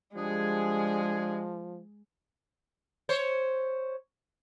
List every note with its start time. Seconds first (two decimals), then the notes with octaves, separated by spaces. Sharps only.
0.16 F3 G3 G#3 D4 G#4
3.09 C5 C#5